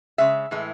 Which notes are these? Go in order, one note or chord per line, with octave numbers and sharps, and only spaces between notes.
C#3 G#3 E5
A2 E3 G#3